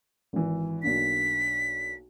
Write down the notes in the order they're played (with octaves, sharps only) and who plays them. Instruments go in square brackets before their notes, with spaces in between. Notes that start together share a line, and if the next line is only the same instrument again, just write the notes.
[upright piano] G#1 E3
[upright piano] B1 A#3 D4 [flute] B6